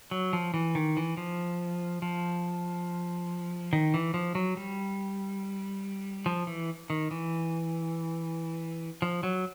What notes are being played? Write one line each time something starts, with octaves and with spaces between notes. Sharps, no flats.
F#3
F3
E3
D#3
E3
F3
F3
D#3
E3
F3
F#3
G3
F3
E3
D#3
E3
F3
F#3